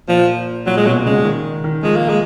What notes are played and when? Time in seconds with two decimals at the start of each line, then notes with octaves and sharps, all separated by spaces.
0.08 A#2 F3
0.66 A#2 F#3
0.77 G#3
0.86 B2 F#3
0.99 B2
1.06 C#3 G#3
1.24 D#3
1.64 D#3
1.83 F3 G#3
1.96 A#3
2.09 G#3